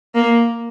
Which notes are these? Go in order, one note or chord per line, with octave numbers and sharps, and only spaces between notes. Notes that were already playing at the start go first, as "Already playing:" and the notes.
A#3